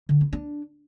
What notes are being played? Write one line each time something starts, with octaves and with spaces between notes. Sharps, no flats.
D3
E4
D4